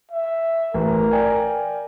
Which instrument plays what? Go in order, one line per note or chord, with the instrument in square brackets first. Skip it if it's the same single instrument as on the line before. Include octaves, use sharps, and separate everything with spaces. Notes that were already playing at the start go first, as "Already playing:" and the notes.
[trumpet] E5
[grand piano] A1 [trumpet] A#4
[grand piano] D5 G5 G#5